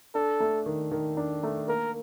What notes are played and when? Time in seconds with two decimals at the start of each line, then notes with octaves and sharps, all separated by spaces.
0.15 D4 A4
0.40 A3
0.66 D#3
0.91 D#3
1.17 D4
1.43 A3
1.68 A#3 A#4